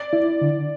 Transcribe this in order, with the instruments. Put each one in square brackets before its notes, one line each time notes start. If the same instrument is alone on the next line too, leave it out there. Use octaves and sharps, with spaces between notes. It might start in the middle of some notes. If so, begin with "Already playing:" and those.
Already playing: [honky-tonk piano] D5
[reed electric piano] E4
D3